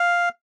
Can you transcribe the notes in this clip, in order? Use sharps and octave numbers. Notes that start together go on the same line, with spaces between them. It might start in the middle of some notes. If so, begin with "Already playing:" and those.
Already playing: F5